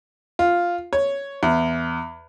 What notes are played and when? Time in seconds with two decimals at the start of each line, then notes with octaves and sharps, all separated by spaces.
0.39 F4
0.93 C#5
1.43 E2